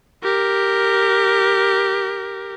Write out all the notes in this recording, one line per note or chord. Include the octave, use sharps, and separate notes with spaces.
G4 A#4